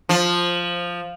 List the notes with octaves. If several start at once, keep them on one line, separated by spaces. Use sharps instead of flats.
F3